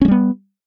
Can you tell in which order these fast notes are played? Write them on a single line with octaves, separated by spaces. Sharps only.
C#4 G#3 G3 B3